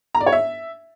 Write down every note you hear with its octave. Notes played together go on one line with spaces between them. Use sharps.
A#5
D5
C#5
E5